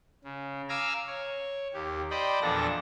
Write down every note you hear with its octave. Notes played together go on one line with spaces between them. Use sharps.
C#3
F5 G#5 A#5 D6 E6 F6
C#5
D#2 G4
C5 D5 D#5 G5 B5
E2 A#2 F3 D4 A4 A#6